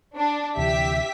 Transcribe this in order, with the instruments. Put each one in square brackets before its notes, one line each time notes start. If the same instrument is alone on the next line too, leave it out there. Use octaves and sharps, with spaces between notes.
[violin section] D4
[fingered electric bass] D2 C3 E3 [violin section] G4 E5 B6